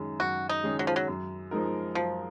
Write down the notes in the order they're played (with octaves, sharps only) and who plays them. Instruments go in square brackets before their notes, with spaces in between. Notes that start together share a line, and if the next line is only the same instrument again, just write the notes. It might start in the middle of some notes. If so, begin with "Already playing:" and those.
Already playing: [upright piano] F#2 D#3 G#3 C#4 G#4
[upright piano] F#2 [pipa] F#4
[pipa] D#4
[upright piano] D#3 G#3 C#4 G#4
[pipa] F#3
F3
F#3
[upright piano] F#2
F3 G#3 D#4 A#4
[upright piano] F#2 [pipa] F3